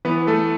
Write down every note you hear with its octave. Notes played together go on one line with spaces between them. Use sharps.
E3 B3 B4
A3 A4